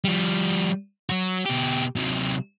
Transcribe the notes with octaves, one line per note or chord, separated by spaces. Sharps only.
F3 G3
F#3 F#4
B2 G4
C3 F#3